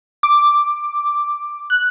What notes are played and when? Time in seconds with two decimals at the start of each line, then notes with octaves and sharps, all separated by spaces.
0.23 D6
1.70 F#6